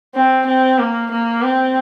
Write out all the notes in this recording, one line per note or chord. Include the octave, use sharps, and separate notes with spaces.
C4
C4
A#3
A#3
C4